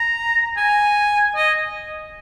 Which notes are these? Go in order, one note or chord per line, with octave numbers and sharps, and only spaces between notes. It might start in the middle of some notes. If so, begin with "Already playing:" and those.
Already playing: A#5
G#5
D#5